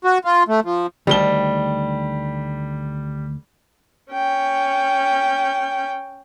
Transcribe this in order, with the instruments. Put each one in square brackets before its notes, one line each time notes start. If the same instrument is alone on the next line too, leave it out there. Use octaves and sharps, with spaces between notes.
[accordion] F#4
F4
A3
F3
[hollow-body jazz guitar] D2 D#3 A5 [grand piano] G3 G7
[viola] C#4 G5